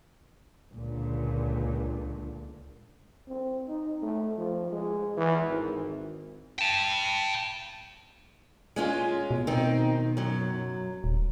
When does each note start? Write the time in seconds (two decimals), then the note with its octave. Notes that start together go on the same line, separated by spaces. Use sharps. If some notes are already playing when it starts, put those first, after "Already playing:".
0.74 C#2 A#2 D3
3.28 C4
3.68 D#4
4.03 A3
4.38 F3
4.72 G#3
5.17 E3
5.49 G#1
6.59 G5 A5
8.76 G#3 C#4 F4
9.31 B2
9.47 D#3 C4 D#4
10.17 F#2 F#3
11.04 D#1